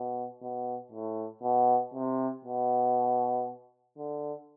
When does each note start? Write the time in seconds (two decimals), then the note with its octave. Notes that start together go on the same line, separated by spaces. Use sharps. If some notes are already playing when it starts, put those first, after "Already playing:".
Already playing: B2
0.42 B2
0.92 A2
1.43 B2
1.94 C3
2.45 B2
3.98 D3